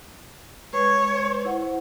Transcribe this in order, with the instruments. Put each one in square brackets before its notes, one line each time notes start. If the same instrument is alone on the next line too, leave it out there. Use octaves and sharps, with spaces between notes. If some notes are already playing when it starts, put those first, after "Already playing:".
[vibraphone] G#3 B4 [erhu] C#5
[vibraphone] E4 C5 F#5